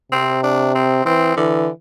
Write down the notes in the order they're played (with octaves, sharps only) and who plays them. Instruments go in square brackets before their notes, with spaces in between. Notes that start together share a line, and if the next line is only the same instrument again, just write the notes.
[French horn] C3 [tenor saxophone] C4
[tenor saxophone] D4
C4
[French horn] E3 [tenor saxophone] C4
[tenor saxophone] D3 [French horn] E3